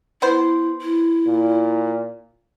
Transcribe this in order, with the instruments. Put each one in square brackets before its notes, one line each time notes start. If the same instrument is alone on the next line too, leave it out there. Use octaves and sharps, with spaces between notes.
[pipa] B3 C5 [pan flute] E4
[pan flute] E4
[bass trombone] A#2